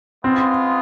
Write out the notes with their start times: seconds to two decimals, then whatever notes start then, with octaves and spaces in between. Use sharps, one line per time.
0.24 G#3 B3 C4 F4